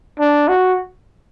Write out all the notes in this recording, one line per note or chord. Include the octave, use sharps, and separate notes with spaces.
D4
F#4